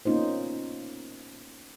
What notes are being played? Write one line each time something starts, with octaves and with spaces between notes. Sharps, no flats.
A#3 B3 C#4 D#4 F4 C5